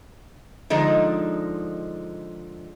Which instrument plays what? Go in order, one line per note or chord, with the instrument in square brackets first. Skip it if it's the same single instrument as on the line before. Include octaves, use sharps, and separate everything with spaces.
[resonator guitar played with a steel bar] D3 F3 G#3 D#4